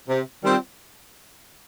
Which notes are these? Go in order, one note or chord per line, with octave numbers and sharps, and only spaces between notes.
C3
D#3 G3 C4 F4